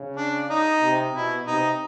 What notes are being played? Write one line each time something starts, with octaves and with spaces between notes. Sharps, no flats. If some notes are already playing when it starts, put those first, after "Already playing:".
Already playing: C#3
D4
D#4
C3
B2 E4
C3 D#4